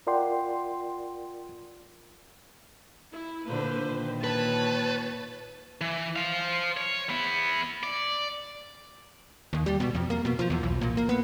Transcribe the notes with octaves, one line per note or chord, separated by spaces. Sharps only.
F4 A#4 D5 F#5 G5 C6
E4
A#2 D3 A#3 B4 C5
A#2 D#3
B4 C#5 A5
E3
C5 F5
C#5
B3 E4
D5
D#2
G3
B2
F2
A#3
B2
F3
E2
B1
A#2
A#3
B3